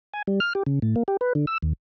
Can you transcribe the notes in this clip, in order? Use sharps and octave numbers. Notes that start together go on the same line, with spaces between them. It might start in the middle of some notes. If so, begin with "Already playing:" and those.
G#5
G3
F6
G4
C#3
A2
A#3
G4
B4
D3
E6
D#2